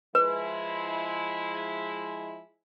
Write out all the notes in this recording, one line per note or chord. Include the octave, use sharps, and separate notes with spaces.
F3 G#3 E4 B4